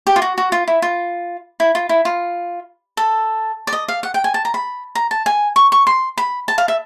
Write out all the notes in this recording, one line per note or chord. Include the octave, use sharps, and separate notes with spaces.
G4
F4
F#4
F#4
F4
E4
F4
E4
F4
E4
F4
A4
D5
D#5
F5
F#5
G5
G#5
A5
A#5
B5
A#5
A5
G#5
C#6
C#6
C6
B5
A5
F5
E5